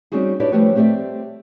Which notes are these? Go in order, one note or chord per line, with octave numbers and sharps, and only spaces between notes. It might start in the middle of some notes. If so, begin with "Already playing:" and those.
G3 C4 C#4 D#4 F#4 G#4
D4 E4 G4 B4 C#5 D5
F3 G3 A3 G4 B4 C#5
A3 C4 G4 C#5 D5 E5